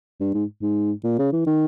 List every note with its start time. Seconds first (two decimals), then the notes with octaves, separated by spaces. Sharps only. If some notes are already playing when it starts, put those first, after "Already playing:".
0.21 G2
0.34 G#2
0.62 G#2
1.04 A#2
1.19 C#3
1.33 E3
1.46 D#3